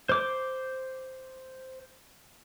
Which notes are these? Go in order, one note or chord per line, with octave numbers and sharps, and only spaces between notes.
C5 D6